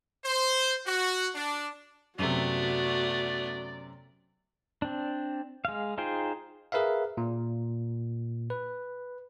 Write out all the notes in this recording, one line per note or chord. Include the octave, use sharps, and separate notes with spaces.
C5
F#4
D4
F#2 C3 A3 B3 F#4 D5
C4 D4
G#3 F5
D#4 F4 G#4 C5 G5
G#4 A#4 B4 E5 F5
A#2
B4